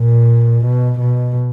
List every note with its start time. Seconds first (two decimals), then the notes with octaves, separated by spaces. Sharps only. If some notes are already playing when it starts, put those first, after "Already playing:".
Already playing: A#2
0.65 B2
1.00 B2